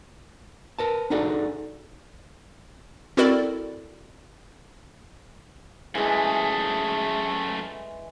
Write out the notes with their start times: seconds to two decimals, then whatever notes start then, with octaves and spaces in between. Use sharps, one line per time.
0.79 A#4 B4 A5
1.10 D4 D#4 F#4 G#4 A4 D5
3.17 C4 E4 F#4 A4 A#4 D5
5.95 F#2 E3 G#3 A3 G#4